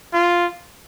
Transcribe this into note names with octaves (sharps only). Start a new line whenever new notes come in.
F4